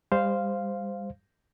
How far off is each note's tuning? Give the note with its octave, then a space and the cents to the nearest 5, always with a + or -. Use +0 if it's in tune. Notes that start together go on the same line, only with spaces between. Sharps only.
G3 +35 C5 -5 F5 -5